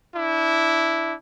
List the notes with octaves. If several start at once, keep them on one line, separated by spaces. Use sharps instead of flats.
D4 E4